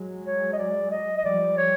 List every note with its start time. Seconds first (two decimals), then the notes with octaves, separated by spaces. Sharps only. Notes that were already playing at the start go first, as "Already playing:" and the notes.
Already playing: F#3 G#3
0.26 C#5
0.53 D#5
0.59 D5
0.91 D#5
1.18 D#5
1.24 F3 G3 D5
1.57 C#5